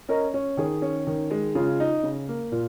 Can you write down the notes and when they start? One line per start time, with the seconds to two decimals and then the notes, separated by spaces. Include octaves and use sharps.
0.08 C#4 A#4 D#5
0.34 C#4
0.57 D#3 G#4
0.82 C#4
1.07 D#3
1.31 G#3
1.55 C#3 F4
1.80 D#4
2.03 C#3
2.29 A#3
2.52 A#2 F4